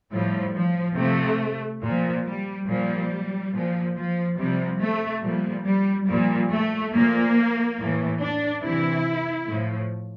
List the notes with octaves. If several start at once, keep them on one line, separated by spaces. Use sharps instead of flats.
A2 F3 G3
F3
C3 F3 A3
A#2 F3
G3
A#2 F3 G3
A#2 F3
F3
C3 F3 G3
A3
A#2 F3 G3
G3
A#2 F3 G3
A3
A#2 F3 A#3
A2 E3
D4
C3 E3 E4
A2 F3